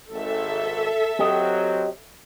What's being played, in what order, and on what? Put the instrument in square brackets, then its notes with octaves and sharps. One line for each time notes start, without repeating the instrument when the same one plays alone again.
[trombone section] G#1 [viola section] A4 E5
[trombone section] F#3 C4 [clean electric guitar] G4 D#5